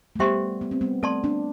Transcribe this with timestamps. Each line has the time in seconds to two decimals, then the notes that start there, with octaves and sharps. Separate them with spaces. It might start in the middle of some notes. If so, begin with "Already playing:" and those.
0.16 A3
0.19 G3 B3 G4 C5 E5 G5 C6
0.61 B3
0.71 C4
0.81 G3 B3
1.03 A3 C4 A4 D5 A5 C6
1.24 B3 D4